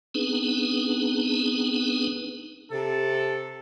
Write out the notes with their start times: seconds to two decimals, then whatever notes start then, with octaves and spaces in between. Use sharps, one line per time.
0.15 B3 C4 D4 D#4 G#4 B4
2.71 C3 A4